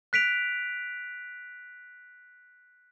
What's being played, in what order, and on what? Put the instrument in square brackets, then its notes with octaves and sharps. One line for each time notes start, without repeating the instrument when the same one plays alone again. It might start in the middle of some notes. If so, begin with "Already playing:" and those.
[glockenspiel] F#6 B6 D7 F7